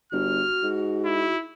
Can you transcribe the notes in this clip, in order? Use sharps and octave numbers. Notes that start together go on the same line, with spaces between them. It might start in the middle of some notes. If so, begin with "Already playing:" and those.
G1 F#4 F6
G#2
E4